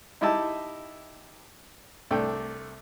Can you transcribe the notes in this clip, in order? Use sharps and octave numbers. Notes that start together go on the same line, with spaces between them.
D#4 E4 G4 D#5 E5 A5
C2 A3 D4 G5